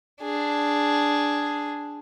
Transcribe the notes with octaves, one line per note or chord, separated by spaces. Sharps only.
D4 G#4